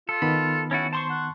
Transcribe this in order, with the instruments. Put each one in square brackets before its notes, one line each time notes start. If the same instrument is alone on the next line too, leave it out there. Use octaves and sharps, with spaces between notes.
[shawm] F4 [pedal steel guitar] A4
[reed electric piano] D#3 B3 B5
[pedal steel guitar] C#4 E4 F#4 [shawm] A5
[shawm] C5 [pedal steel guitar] A5 C6 C#6
[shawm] F#5